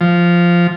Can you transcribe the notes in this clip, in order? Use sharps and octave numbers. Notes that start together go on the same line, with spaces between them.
F3